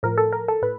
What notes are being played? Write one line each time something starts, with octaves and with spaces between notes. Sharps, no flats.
A2 F3 A#4
A4
A#4
A4
A2 B4